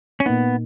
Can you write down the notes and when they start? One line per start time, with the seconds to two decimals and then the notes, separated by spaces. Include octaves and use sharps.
0.20 C#4
0.25 A#2 A#3 B3 D#4